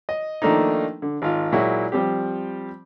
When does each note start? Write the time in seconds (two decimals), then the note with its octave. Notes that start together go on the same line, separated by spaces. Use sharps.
0.09 D#5
0.42 D#3 F3 A3 A#3 D4 D#4
1.02 D3
1.22 G#1 F4
1.52 A#2 F#3 G#3 E4 F#4
1.92 F3 G3 C4 G4